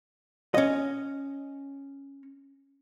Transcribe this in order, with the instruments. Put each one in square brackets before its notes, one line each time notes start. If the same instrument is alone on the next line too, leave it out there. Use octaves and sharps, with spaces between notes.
[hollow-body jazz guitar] C#4 D#5